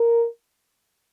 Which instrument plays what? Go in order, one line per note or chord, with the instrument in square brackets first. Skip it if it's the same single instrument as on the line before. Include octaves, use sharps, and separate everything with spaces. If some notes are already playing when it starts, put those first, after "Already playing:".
Already playing: [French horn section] A#4